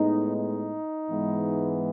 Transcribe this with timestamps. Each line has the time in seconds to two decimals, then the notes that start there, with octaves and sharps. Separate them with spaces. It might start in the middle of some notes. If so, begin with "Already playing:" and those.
Already playing: A2 G#3 B3 D#4
0.35 D#4
1.09 G#2 E3 G#3 B3